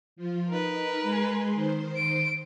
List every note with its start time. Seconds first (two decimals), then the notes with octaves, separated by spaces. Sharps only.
0.16 F3 F4
0.49 D#4 A#4 B4
1.02 G#3 G#5 C6
1.54 D#3 C5 C6
1.96 D7